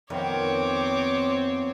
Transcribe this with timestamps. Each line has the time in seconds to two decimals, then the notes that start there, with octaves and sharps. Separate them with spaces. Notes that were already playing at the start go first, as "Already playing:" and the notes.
0.10 F2 D#3 B3 C4 C#5 D6